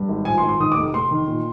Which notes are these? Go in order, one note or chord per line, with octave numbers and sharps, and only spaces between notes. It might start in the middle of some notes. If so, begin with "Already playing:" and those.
Already playing: G2
G#1
F3 G#5
C6
G#1
C6
D#3 D#6
D6
F1
F1 C6
D#3
A#2